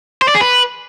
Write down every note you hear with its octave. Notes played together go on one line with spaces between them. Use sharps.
C5
D5
G#4
B4